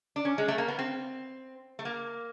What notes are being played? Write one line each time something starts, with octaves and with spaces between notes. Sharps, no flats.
D4
C#4
G#3
A3
A#3
B3
C4
A3
A#3